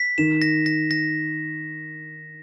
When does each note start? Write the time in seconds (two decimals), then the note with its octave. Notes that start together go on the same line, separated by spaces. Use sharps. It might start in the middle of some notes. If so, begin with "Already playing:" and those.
Already playing: B6
0.18 D#3 E7
0.42 A#6
0.66 A#6
0.91 A#6